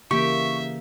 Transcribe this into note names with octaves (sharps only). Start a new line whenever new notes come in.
C#3 E3 A#3 G4 E5 C#6